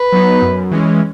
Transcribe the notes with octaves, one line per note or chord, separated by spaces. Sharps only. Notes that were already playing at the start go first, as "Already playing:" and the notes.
Already playing: B4
F#3 B3 D#4
F#2
E3 G#3 C#4